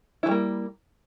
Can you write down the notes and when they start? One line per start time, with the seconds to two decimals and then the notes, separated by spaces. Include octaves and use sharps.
0.23 E4
0.26 E3
0.29 G3
0.31 A#3